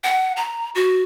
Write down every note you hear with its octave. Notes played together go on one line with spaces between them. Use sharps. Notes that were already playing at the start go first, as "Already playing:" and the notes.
F#5
A#5
F#4